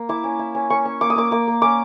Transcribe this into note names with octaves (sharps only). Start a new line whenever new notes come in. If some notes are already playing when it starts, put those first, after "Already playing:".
Already playing: A#3
E4 D6
C#4
E4
C#4
C#4 C#6
C#4
A#3 D6
D#6
A#3 D6
A#3 D6
A#3
C#4 D6